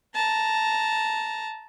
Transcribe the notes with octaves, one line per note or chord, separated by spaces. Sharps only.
A5 A#5